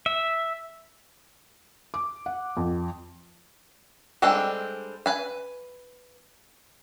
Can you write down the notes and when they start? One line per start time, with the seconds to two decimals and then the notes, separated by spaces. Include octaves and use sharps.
0.06 E5
1.94 D6
2.26 F#5
2.57 F2
4.22 G3 G#3 C4 D4 A4
5.06 B4 G#5